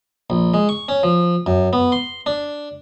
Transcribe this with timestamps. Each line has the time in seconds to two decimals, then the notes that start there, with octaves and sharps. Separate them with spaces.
0.30 A#1
0.54 G#3
0.69 C#6
0.89 C#4
1.03 F3
1.46 F#2
1.73 B3
1.92 C6
2.26 D4